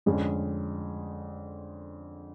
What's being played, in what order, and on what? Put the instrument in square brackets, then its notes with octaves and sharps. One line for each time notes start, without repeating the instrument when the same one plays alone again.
[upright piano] F2 D3 G#3 C#4 G#4